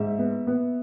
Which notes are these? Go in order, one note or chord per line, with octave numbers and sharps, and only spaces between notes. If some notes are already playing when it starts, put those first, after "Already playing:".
Already playing: G#2 E5
B3
B3